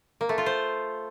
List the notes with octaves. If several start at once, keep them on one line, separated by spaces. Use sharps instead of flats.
A#3
A3
F4
C5